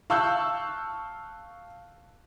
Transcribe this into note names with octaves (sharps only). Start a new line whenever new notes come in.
F5 A5 C#6 E6 F#6 G6